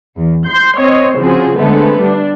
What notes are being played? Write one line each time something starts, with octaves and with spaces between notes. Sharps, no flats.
E2
C6 G6
C4 C5 C#5 D#5
C#3 F3 C4 F#4 G#4
D3 G#3 A3 B3 C4
G3 D4